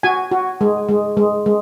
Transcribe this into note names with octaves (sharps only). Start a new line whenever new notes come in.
F#4 G#5
F#4
G#3
G#3
G#3
G#3